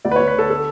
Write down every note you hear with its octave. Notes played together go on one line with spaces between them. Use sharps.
D2 D5
B4
C#5
D2
B4
D3 A4
A4